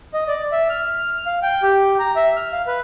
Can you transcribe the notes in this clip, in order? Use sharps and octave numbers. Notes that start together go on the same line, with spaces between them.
D#5
D5
E5
F6
F5
G5
G4
A#5
E5
F6
F5
B4